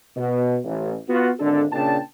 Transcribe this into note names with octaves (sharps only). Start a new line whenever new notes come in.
B2
A1
B3 F4 F#4
G#1 D3 D4 A4
A#2 C#3 D4 G5 A5